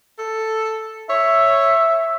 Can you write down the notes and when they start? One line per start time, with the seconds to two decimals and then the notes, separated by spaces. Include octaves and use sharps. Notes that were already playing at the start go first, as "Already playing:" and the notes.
0.19 A4
1.10 C#5 E5